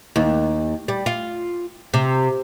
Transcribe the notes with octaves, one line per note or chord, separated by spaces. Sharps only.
D#2
G3
F4
C3